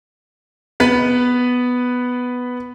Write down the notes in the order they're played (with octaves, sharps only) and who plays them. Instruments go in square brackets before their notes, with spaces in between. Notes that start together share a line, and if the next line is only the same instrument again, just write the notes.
[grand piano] B3 B4